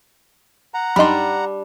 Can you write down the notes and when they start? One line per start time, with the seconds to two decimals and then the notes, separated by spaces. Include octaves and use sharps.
0.74 F#5 A#5
0.96 F#2 G3 D4 D#4 B5 C6